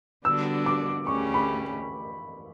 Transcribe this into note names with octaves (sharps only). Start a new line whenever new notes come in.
D3 G3 B3 D4 F#4 E6
D6
D2 C#3 G3 C#4 C#6
B5